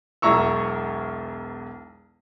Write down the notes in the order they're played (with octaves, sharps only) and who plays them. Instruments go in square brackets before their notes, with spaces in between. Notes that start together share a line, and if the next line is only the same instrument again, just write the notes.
[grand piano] E1 B1 E4 A#5 C#6 E6